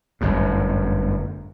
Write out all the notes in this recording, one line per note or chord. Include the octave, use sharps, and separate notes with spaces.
G1 F#2 A2